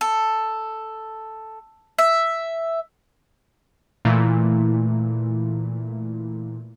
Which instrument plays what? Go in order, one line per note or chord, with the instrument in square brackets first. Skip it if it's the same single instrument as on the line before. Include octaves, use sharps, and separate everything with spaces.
[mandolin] A4
E5
[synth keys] A#2 E3 A3 E4